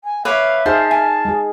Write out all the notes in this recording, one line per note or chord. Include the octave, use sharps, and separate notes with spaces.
G#5
B4 C#5 E5 F5 D6
D#4 G#4 C5 F5 A5
G#5
G#3 G#4